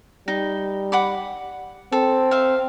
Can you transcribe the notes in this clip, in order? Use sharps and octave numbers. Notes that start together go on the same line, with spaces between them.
G3 D#4
F#5 B5 D6
C4 A4
E5 F5